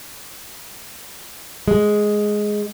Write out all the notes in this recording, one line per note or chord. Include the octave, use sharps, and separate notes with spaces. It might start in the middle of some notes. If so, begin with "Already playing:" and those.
G#3